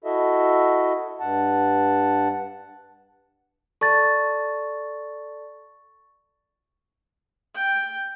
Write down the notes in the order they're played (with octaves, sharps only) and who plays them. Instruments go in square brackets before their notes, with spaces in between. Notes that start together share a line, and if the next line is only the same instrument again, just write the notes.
[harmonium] E4 F#4 A4 D#5 E5
G2 F#5 A5
[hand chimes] A4 D5 A5 [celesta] C#6 A6
[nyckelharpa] G5